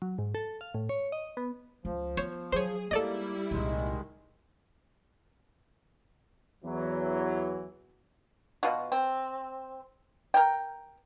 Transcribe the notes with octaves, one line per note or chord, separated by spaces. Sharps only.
F#3
G#2
A4
F5
A2
C#5
D#5
B3
C#2 F3
B3 C5 C#5
F#3 G#4 C5 C#5
G3 G#3 A#3 D#4 E4 A4 D5 D#5
C2 A#2 D#3 G#3
E2 E3 F#3
B2 F4 F#4
C4
A#4 G5